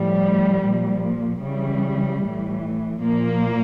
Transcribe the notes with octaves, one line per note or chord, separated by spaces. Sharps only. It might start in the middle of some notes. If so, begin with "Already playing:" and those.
Already playing: A2 F3 G3
A#2 F3
C#3 E3 G3
A2 E3
A#2 F3 A#3